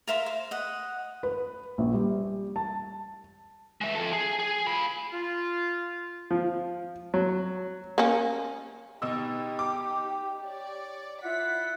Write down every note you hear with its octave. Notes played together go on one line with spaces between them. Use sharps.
A#4 E5 F5 C6
C5
D#5 F#5
B4
A#1
G3
A5
G#3 E5
F3 A4
G#4
G#4
F4 B5
F4
F3
F#3
A#3 C#4
B2 D#4 G4 D#5 E6
D6
C#5 D5
E4 F4 F#5 B6